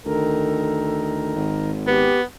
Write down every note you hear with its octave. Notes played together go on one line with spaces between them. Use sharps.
D2 D#3 A4 A#4
G#1
B3 G4